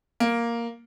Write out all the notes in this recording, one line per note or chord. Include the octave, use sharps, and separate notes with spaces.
A#3